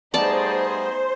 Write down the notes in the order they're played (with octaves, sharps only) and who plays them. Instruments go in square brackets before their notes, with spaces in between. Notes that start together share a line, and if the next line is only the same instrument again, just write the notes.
[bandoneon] G3 A3 B3 [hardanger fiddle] D#4 G#4 [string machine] C5 [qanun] D5 A5